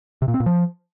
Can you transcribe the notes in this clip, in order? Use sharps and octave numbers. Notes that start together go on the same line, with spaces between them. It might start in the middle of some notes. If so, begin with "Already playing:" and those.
C3
A#2
C4
A#2
F3